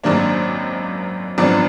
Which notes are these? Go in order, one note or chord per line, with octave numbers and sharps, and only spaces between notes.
G#1 F#2 D#3 A#3 D4
G#1 F#2 F3 B3 D4